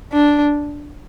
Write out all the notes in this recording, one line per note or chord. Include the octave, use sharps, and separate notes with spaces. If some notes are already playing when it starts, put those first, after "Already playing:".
D4